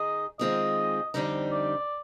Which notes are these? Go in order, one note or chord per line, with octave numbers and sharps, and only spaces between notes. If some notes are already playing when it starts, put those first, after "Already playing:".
Already playing: D#3 D#4 G#4 D#5
D#3 G#3 C4 F4 G#4 D#5
F2 D3 G3 C4 D#4
D5